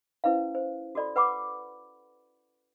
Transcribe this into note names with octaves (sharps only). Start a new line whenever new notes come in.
C#4 E4 B4 C5 F5
C5
F#4 A4 D5 B5
B4 F#5 B5 D6